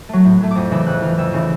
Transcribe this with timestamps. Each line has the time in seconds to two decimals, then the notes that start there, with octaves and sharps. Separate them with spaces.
0.09 F#3 A3
0.25 A2
0.41 F#3 A3
0.51 F2 D6 D#6
0.71 C#3 E3 E6
0.87 F2 F#6
1.02 C#3 E3 F6
1.18 F2 E6
1.33 C#3 E3